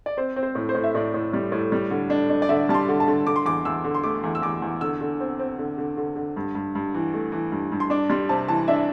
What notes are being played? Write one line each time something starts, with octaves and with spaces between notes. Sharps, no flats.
D5
C4 C5
C4
C5
A2
C5
A2
E5
A2 D5
A2
G3
A2
G3
D3
D4
D4
D5
D3 E5
G3 A5
C6
D3
A5
D3
D3 D6
C6
E2 D6
E2 E6
D3
C6
A3 D6
E2
E6
E2 D6
E2
D3 E6
D3
C4
C4
D3
D3
D3
D3
G2
G2
G2
E3
A3
E3
G2
G2
C6
D4 D6
G3 C6
C3 A5
E3 A5
D4 E5